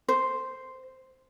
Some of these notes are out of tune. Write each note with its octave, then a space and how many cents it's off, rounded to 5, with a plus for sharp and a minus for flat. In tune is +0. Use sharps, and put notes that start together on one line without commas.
C5 -5